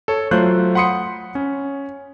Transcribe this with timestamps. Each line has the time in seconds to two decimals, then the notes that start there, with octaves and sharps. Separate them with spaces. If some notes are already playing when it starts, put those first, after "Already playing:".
0.08 A4 C#5
0.31 F#3 A3 F4 C5 F#6 G6
0.75 F#5 B5 C6 D#6 C#7
1.35 C#4